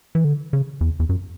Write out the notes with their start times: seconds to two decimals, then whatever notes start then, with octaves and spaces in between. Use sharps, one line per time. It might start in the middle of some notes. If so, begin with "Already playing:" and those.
0.15 E3
0.24 D3
0.53 C#3
0.81 E2
1.00 E2
1.09 F#2